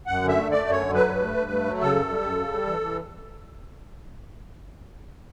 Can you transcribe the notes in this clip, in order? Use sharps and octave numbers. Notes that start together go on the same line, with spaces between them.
F#2 F#5
D3
E5
A3
A3 D5
F#2
C#5
D3
F#3 B4
G2
A3
G2
A3
F#3
C#3 A4
F#2
G3
F#2
C#3
G3
E3
E3